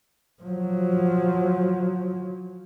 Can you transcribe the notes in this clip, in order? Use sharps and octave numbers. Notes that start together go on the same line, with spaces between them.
F3 F#3